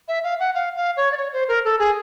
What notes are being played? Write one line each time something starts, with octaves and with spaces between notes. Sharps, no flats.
E5
F5
F#5
F5
F5
C#5
D5
C#5
C5
A#4
A4
G#4